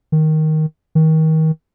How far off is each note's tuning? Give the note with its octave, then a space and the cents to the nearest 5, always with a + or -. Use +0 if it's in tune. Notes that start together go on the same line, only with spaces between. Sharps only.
D#3 +5
D#3 +30